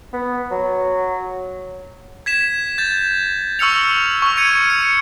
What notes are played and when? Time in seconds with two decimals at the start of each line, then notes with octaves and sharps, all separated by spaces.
0.13 B3
0.51 F#3
2.26 G#6 B6 E7
2.78 G6 A6
3.59 C#6 E6 F6 C#7 F7
4.22 C#6 F6
4.37 G#6 C#7 D#7
4.70 C#7